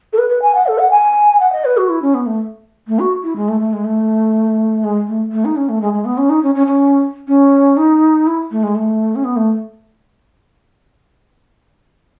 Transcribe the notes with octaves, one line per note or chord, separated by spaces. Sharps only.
A4
B4
B4
G#5
F#5
A4
F#5
G#5
F#5
D#5
B4
F#4
E4
C#4
B3
A3
A3
F#4
E4
G#3
A3
A3
G#3
A3
G#3
A3
A3
D#4
C#4
A3
G#3
G#3
B3
C#4
D#4
C#4
C#4
C#4
C#4
D#4
E4
A3
G#3
A3
C#4
B3
A3